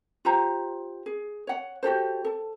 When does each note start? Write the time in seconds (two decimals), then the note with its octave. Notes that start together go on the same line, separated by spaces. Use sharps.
0.25 F4 G4 C5 A#5
1.06 G#4
1.47 C#5 F#5
1.83 F#4 G4 A4 C5
2.25 A4 A5